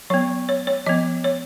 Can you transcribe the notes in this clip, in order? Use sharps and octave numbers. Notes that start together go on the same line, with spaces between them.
F#3 B3 C#5
C#5
C#5
F3 B3 D#5
C#5